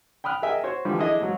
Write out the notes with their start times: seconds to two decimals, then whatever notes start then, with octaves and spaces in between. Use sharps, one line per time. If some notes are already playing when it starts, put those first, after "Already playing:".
0.24 G5 B5 D#6 F6 F#6
0.42 G#4 A#4 D#5 E5 G5 G#5
0.64 F#4 C5 C#5
0.85 D3 E3 F3 G3
0.98 D4 E4 G#4 A4 D#5 E5
1.21 G#2 F#3